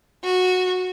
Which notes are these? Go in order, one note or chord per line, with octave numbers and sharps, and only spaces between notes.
F#4